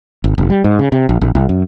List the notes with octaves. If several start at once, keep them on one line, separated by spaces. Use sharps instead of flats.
G#1
F1
G3
G#2
C#3
C3
A#1
A#1
C2
F#2